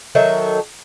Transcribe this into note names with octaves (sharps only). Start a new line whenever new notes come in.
D#3 F#3 A4 E5